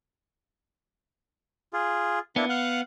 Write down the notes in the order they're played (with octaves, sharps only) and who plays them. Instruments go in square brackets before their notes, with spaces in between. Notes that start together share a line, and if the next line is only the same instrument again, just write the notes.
[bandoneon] F4 G#4
[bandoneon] A#3 D4 E4 [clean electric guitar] B3
[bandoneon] F5 F#5 F#6